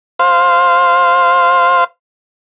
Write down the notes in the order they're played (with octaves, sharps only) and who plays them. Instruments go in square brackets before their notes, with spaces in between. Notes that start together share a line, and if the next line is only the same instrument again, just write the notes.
[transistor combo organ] C5 F5